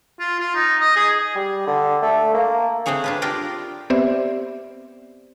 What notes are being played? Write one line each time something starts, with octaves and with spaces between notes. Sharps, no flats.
F4
F4
D#4
D#5
G#4
G3
D3
A3
A#3
A3 C4 D4 G#4 C#5
D4 F4 B4
D4 F4 G4 A#4 D5 G5
B3 C4 G4 C5 D5 E5